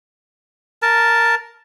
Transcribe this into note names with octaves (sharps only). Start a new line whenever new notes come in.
A#4 A5